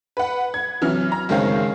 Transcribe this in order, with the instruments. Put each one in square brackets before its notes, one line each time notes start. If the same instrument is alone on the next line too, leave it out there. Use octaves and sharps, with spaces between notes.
[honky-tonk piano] B4 F#5
G#6
C3 E3 F#3 F6
A#5
F#1 D#3 G#3 C4 C#5 F5